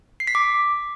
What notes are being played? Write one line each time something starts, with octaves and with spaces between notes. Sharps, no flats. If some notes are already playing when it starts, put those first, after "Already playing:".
C7
B6
D6